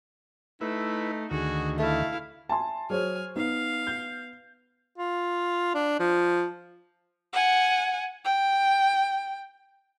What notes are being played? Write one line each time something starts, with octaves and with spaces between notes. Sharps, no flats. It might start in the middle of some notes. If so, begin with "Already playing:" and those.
A3 D#4 E4 B4
D2 D#3 F#4 G#4
A3 E4 F5
E5 G#5 A5 C6
F#3 G#4 C5 C#5 G#5 F6
B3 D#4 F5
G6
F4
D4
F3
F#5 G#5
G5